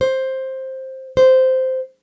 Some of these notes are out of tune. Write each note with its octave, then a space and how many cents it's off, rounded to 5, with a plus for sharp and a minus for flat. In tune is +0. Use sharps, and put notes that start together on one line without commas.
C5 +10
C5 -10